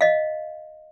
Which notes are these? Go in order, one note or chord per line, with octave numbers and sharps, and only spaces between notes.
D#5 F5